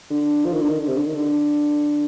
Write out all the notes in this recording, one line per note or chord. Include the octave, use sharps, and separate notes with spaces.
D3
F3
D#3
D3
D#3
D3
C3
D3
D#3
D3